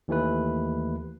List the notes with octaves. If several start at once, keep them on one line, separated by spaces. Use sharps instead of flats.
D#2 E3 A3 B4